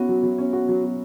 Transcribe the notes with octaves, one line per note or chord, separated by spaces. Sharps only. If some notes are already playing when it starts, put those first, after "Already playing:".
Already playing: B3 C#4 E4 F#4
F#3
F#3
C#4
F#4
F#3
F#3